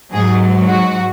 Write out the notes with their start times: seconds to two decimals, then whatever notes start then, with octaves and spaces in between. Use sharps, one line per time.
0.12 G#2 F#3 G#4
0.68 F#4